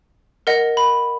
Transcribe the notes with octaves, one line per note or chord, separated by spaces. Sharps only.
A#4 D#5 F#5
B5